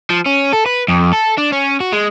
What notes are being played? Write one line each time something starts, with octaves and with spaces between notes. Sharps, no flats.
F3
C#4
A4
B4
F2
A4
D4
C#4
F#4
G#3